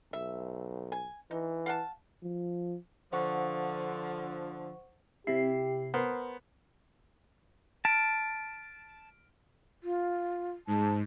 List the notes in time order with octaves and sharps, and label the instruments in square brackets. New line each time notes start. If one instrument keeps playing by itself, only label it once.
[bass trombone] B1 [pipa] E5
[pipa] G#5
[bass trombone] E3 [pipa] D#4
[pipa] F5 F#5 A5
[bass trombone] F3
[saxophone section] D3 F3 [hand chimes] C5 F#5 C#6
[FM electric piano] C3 C7 [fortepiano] E4 [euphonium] G4
[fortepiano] B3 A#4 C5
[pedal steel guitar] A5 [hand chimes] F6 B6 D7
[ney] F4
[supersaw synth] G#2 [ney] A5